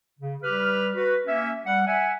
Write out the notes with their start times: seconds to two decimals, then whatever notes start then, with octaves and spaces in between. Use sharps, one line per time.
0.19 C#3
0.43 G3 G4 B4 F6
0.94 F#4 B4
1.27 A#3 C#4 E5
1.66 G3 F#5
1.87 E5 F#5 G#5